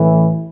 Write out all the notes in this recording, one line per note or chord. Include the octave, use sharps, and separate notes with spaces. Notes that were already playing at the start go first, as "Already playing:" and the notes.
Already playing: A1 A2 E3